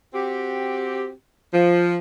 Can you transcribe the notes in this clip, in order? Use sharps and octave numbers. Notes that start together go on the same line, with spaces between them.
C4 F#4 G4
F3